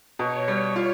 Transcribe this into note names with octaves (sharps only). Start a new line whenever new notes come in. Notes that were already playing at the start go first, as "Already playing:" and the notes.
B2 C#5
G3
F4